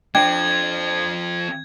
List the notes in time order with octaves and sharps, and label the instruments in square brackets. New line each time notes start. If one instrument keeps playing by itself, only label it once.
[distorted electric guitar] F3 C4 [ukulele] D4 G5 [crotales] G#6